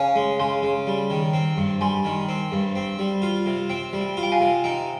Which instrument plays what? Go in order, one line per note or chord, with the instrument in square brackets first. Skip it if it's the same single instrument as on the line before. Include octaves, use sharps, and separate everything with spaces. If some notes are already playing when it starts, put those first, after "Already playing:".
Already playing: [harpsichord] C#3 C#4 [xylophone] F5 G#5
[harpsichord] G#3
[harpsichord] C#3 [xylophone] G#5 C6
[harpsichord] C#3
G3
D#3
C4
G2
[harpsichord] G3 [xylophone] G#5 C6
[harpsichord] D#3
C4
G2
C4
G3
F4
C3
[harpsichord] C4 [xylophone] G5
[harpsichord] G3
[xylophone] G5
[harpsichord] F4
[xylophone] G5
F5 G#5
[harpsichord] C3
[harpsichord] D#4 [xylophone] G5